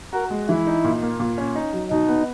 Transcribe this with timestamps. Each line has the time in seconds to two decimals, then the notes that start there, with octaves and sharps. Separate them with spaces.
0.13 F#4 A#4
0.30 G#3
0.49 E3 E4
0.67 D#4
0.84 A#2
1.02 A#3
1.20 A#2
1.38 C#4
1.55 D#4
1.73 F#3
1.90 B2 D#4
2.08 B3